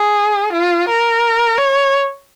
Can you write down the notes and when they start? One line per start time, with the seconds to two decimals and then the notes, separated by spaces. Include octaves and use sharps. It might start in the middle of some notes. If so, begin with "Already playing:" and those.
Already playing: G#4
0.53 F4
0.89 A#4
1.58 C#5